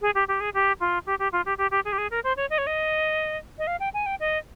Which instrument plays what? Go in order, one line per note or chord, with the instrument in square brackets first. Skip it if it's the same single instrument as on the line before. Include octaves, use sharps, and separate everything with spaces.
[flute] G#4
G4
G4
G#4
G4
F4
G4
G4
F4
G4
G4
G4
G#4
G4
G#4
A#4
C5
C#5
D#5
C#5
D#5
D#5
F5
G5
G#5
G5
D#5